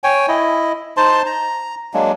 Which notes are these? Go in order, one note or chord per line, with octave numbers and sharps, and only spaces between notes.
C#5 G5 G#5
E4 D#5
D#4 C5 A5 C6
A#5
F#3 G#3 A#3 D4